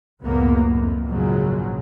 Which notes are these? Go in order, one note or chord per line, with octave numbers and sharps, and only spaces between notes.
C#2 F#2 A2 A#3 B3
F2
A#1 G#2 C#3 F3 F#3 G#3